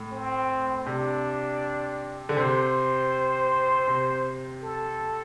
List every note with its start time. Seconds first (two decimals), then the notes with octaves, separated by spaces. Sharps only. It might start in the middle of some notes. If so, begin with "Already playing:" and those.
Already playing: A2
0.12 C4
0.86 C3 D4
2.29 D3
2.37 C3 C5
3.88 C3
4.63 A4